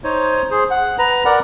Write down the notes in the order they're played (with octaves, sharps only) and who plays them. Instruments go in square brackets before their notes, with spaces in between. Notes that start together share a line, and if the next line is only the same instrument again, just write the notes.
[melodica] D#4 C5 C#5
G#4 C5
F#5
B4 A#5
A#4 D5 F#5